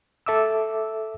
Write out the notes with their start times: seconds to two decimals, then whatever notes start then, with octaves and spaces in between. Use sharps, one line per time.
0.26 A4 E5 D6 E6